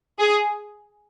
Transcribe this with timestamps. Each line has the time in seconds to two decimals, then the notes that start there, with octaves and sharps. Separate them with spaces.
0.19 G#4